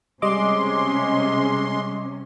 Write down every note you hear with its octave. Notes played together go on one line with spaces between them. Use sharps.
C3 G3 G#3 C#4 D#5 C6 D6